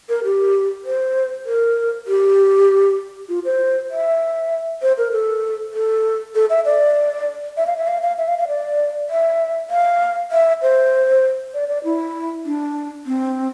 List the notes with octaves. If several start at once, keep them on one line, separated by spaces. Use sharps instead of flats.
A#4
G4
C5
A#4
G4
F4
C5
E5
C5
A#4
A4
A4
A4
E5
D5
E5
F5
E5
F5
F5
E5
F5
F5
D5
E5
F5
E5
C5
D5
D5
E4
D4
C4